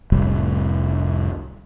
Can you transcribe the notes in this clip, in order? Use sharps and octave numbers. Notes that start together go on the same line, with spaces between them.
F1 C2 A2 G3